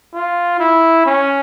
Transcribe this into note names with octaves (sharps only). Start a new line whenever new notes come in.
F4
E4
C#4